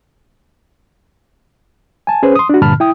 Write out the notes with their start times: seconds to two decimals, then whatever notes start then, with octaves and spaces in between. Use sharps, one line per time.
2.07 G#5 A5
2.23 C#4 G#4 B4 C5
2.36 C6 D#6
2.49 D4 F#4
2.62 G2 A#2 D3 A5 B5 F6
2.80 E4 G5 D#6